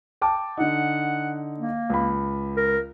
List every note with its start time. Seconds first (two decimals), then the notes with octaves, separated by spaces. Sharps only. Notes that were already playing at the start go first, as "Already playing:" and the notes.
0.22 G5 A5 D6
0.57 D3 D#4 F#5
1.60 A#3
1.90 C#2 B5
2.57 A#4